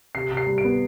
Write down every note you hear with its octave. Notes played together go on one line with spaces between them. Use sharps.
C3 C7
C3
C7
G3
D7
B3